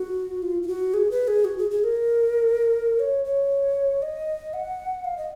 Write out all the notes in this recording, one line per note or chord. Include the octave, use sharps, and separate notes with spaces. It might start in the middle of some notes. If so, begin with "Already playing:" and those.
Already playing: F#4
F4
F4
F#4
G#4
B4
G#4
F#4
G#4
G#4
A#4
C#5
C#5
D#5
F#5
F5
D#5